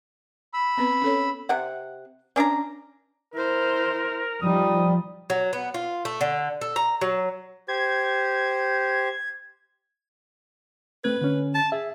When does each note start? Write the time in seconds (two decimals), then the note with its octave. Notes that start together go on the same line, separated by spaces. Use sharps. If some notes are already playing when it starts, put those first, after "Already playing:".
0.54 B5 E6
0.77 B3 C4 B4
1.02 C#4 A4 C#5
1.49 C3 F#5
2.36 C#4 D4 D#5 A#5
3.34 E4 A#4 C5
4.42 F3 G3 D#4 D#6
5.30 F#3
5.53 B3
5.74 F4
6.05 A3
6.21 D3
6.61 A4
6.76 A#5
7.01 F#3
7.68 G4 C5 G#6
11.04 A3 C4 B4 G#6
11.21 D3 C#4
11.55 A5
11.72 G#4 E5